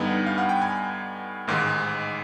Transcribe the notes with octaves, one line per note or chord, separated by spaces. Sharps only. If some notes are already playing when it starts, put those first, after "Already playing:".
Already playing: G2 D3 G3 B3 D#4 G#5
F5
F#5
G5
G#5
A1 G#2 D#3 G#3